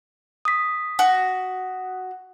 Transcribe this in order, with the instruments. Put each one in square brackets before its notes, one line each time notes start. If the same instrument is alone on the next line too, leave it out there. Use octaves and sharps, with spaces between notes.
[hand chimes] D#6 B6
[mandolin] F#4